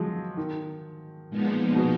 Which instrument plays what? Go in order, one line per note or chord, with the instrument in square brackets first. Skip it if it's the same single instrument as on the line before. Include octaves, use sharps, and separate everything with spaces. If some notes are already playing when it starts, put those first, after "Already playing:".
Already playing: [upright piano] F3 F#3 G#3
D#3
[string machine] A#2 F3 G#3 B3 D#4
[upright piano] B2